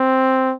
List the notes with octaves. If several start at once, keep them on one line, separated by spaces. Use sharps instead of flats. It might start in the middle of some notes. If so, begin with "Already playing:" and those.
Already playing: C4